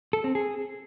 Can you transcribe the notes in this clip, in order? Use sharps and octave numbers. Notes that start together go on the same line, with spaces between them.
A4
C4
G#4